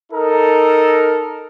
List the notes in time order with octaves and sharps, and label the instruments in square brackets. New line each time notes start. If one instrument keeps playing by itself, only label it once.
[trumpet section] D#4 A4 A#4